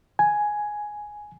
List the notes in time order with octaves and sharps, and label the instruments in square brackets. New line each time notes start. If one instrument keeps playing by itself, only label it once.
[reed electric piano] G#5